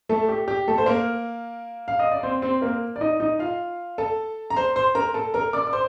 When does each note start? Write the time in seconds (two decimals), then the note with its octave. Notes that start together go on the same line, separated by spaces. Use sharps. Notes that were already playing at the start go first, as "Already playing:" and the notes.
0.09 A3 A4
0.29 G4
0.48 G4
0.68 A3 A4
0.78 C5
0.86 A#3 A#4
1.88 F5
1.99 D#5
2.12 D5
2.23 C4 C5
2.42 C4 C5
2.61 A#3 A#4
2.96 D5
3.01 D#4 D#5
3.20 D#4 D#5
3.39 F4 F5
3.98 A4 A5
4.50 A#5
4.56 C5 C6
4.76 C5 C6
4.95 A#4 A#5
5.14 A4 A5
5.34 A#4 A#5
5.53 D5 D6
5.67 D6
5.73 C5 C6